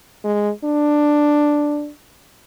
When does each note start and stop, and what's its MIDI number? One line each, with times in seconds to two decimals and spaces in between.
0.24 0.50 56
0.64 1.90 62